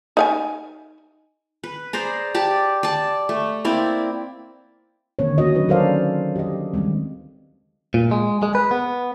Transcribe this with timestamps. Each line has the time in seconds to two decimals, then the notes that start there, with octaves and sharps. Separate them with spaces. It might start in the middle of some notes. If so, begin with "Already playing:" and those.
0.17 D#4 F5 G#5
1.64 B4
1.93 G#4 C5 D5 A#5
2.35 G4 D5 A5
2.83 D5 A5
3.29 A3
3.64 A#3 C4 E4 D5
5.19 D3 D#3 A#3 C4 C#4 C#5
5.38 A#3 C#4 F#4 D#5
5.54 F#3 D4 D#4 B4
5.69 C#4 A4 A#4 C5 D5 F5
6.36 G4 D#5
6.74 D#3 G3 G#3 C4
7.94 A#2
8.11 G#3
8.43 G#3
8.55 B4
8.71 B3